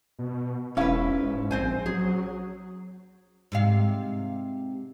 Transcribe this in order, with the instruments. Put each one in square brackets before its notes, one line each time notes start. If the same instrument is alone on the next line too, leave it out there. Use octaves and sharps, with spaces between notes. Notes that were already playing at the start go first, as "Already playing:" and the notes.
[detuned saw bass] B2
[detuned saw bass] E1 [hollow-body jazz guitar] C#4 F5 [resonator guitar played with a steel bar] E4 B4
[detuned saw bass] G#2
[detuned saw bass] A#1 [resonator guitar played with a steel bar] C4 C5 G#5
[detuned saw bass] F#3 [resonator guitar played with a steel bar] G#4
[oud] G#2 C3 F5